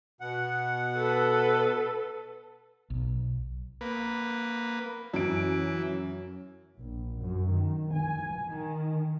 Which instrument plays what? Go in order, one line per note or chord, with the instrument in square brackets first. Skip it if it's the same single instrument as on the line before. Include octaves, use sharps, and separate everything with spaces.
[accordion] B2 F#5
[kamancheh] A4 B4
[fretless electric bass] B1
[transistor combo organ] A#3 B4
[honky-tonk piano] F#2 D7 [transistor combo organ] E3
[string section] A#1
F#2
D#3
G#5
D#3